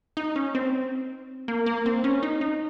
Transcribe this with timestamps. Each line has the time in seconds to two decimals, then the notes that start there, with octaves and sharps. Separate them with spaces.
0.17 D#4
0.36 C#4
0.55 C4
1.48 A#3
1.66 A#3
1.86 C4
2.04 C#4
2.23 D#4
2.41 D#4